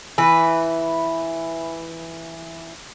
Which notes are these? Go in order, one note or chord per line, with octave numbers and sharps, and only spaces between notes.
E3 B4